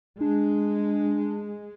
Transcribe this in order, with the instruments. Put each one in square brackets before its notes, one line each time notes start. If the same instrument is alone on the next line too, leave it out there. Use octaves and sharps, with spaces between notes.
[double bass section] G#3 [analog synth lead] D4